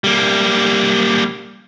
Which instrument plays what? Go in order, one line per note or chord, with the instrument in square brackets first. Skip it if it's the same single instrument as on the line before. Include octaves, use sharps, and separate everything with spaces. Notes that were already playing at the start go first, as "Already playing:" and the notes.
[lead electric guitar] G3 A#3